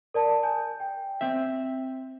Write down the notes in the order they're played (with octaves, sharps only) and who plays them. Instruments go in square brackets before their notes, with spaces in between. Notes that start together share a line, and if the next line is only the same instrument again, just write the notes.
[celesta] A#4 D5 A5
G#5 G6
G5
[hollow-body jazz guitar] C4 E5